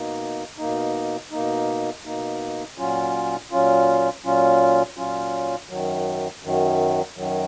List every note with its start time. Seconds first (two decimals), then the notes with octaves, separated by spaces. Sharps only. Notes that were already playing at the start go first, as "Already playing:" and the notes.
Already playing: B2 A#3 D#4
0.58 B2 A#3 D#4
1.31 B2 A#3 D#4
2.05 B2 A#3 D#4
2.78 A#2 F#3 C#4 F4
3.51 A#2 F#3 C#4 F4
4.24 A#2 F#3 C#4 F4
4.97 A#2 F#3 C#4 F4
5.69 F#2 D#3 F#3
6.43 F#2 D#3 F#3
7.17 F#2 D#3 F#3